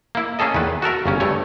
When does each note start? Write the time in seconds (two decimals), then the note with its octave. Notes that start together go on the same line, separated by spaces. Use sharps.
0.15 A#3 E4
0.39 A#3 C#4 G#4 A4 D#5
0.54 E2 D#3 B4
0.82 F#4 A4 A#4 E5
1.06 G1 C#3 C#4
1.20 G2 A3 C#5